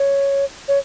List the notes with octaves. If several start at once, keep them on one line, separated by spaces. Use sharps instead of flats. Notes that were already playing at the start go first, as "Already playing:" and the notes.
Already playing: C#5
C#5